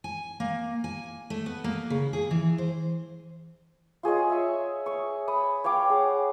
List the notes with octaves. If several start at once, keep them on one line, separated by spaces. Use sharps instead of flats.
G#5
A#3
G#5
A3
B3
A#3
C#3
G#4
E3
C5
F4 G#4 C#5 D#5
E5 C#6
C#5 C#6
B5 D#6
C#5 F5 G5 D6
G#4 F#5